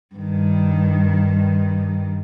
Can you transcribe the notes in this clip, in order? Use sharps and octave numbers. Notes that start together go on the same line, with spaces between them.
G2 D#3